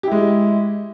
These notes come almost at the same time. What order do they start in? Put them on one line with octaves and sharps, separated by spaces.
G4 E4 G#3